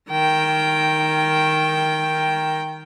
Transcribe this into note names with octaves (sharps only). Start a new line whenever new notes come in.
D#3 G5